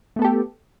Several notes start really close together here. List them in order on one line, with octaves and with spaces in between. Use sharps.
A3 B3 A4 G4